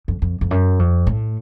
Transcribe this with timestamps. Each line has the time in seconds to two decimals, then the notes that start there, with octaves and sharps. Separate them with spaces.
0.08 F2
0.22 F2
0.41 F2
0.51 F#2
0.79 F2
1.07 A2